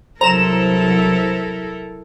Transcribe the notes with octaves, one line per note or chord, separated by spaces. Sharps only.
C2 F#3 E4 A4 A#4 C5 A#5 E7